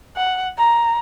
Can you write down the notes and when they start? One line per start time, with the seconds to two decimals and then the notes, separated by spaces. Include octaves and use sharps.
0.16 F#5
0.58 A#5